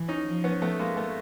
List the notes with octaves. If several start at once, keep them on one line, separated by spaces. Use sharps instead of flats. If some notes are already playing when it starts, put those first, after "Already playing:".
Already playing: E3
C#4 D#4
F3
B3 C#4
A3 B3
G#3 A#3
A3 B3